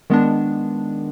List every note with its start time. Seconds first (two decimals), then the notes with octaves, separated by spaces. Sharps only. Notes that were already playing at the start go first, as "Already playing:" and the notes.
0.10 D#3 G#3 B3 D4